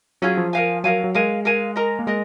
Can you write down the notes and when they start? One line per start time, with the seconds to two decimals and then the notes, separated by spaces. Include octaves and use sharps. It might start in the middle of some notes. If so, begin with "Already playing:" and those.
0.22 F#3 C#4 F4 G#4
0.37 F3
0.53 A#4 F5 G#5
0.84 F#3 A#4 F5 G#5
1.04 F#3
1.15 G#3 A#4 F5 G#5
1.45 A#4 F5 G#5
1.76 A#4 D#5 A#5
1.99 A#3
2.07 G#3 A#4 D#5